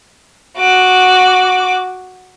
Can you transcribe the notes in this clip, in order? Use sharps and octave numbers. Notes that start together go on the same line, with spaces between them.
F#4 D6